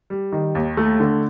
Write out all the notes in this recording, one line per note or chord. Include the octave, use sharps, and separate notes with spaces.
G3
D#3
D#2
A3
D3